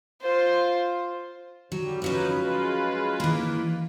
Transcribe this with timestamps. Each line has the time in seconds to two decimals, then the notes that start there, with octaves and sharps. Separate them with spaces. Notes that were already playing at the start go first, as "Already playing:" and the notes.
0.21 F4 C5
1.72 D3 F#3 G3
2.02 F3 F#3 C#4 D#4 B4
2.35 G#3 F4 B4
3.20 E3 A#3